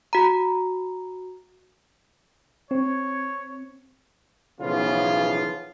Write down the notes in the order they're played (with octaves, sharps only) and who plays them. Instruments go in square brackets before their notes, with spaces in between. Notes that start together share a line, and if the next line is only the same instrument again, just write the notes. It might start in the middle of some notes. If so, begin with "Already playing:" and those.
[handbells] F#4 A#5
[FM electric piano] C4 [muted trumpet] C#5
[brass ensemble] B1 C#3 E3 F3 B3 F4